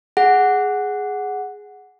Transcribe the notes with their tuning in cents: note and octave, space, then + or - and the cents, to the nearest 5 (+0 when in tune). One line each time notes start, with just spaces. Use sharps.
G#4 +0 F#5 +0